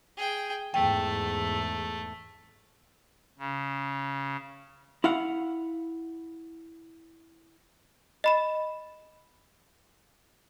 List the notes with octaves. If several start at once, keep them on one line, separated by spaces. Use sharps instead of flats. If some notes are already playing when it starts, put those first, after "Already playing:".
G#4 G5
E2 G#2 A3 G5
C#3
E4 F5 F#5
D#5 B5 E7